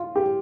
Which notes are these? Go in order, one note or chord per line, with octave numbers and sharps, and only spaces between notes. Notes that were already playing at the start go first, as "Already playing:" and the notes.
Already playing: F4
G4